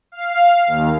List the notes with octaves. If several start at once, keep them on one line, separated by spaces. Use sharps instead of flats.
F5
D#2